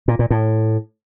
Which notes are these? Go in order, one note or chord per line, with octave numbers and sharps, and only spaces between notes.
A#2
A#2
A2